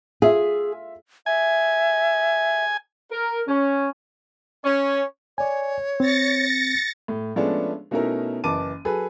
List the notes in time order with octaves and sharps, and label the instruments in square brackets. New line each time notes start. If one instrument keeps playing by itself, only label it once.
[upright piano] F4 E5 [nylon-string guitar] G#4
[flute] E5 [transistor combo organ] G#5
[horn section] A#4
C#4
[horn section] C#4 [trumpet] C#5
[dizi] C#5 [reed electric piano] D5 G#5
[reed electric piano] C4 [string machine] A6 A#6 C#7
[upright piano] A2
F3 G#3 A3 B3 C#4 D4
B2 A3 C#4 D#4 E4 A#4
F#1 E3 A5 D6 D#7
F#3 G#4 A4 B4